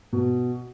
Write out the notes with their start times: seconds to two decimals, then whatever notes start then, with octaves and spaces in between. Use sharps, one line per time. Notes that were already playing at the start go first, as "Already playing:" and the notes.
0.13 B2